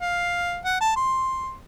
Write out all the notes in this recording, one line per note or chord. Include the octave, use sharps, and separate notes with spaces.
F5
F#5
A5
C6